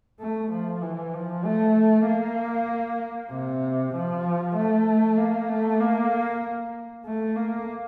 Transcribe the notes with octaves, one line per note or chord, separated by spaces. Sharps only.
A3
F3
E3
F3
A3
A#3
C3
F3
A3
A#3
A3
A#3
A3
A#3